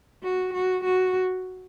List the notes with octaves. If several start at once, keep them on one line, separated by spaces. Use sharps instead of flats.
F#4
F#4
F#4